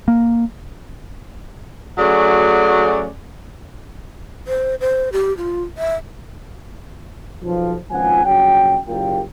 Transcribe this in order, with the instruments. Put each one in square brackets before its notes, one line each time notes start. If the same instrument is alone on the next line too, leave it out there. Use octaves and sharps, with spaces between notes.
[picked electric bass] A#3
[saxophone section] F#3 A3 C#4 F#4 G#4 D5
[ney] C5
C5
G4
F4
E5
[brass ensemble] B1 F3
G#1 C#2 F3 F#5 G#5
A#1 C#3 F#3 F#4 G5
F#1 A#2 F4 G4 A#4 G5